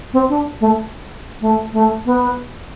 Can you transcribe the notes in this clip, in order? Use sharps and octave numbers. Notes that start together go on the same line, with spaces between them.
C4
D4
A3
A3
A3
B3